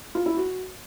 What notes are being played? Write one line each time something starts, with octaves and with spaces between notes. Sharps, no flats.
F4
E4
F#4